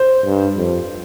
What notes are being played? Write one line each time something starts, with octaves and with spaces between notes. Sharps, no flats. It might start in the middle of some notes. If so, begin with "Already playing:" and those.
Already playing: C5
G2
F2